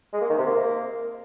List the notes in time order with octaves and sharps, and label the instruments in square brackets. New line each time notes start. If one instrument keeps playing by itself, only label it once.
[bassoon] G#3
A#3
D#3
C3
A#3